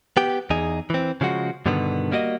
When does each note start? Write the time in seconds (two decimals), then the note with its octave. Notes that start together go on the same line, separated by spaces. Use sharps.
0.17 B3 G4
0.50 E2 D#4 G#4
0.90 E3 C4
1.21 C#3 F3 G#3 F#4
1.66 G2 B2 D3 D#3 B3
2.12 G3 A#3 F#4 D5 D#5